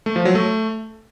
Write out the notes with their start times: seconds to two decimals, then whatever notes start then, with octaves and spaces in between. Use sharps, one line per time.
0.06 A3
0.16 F3
0.25 F#3
0.35 A3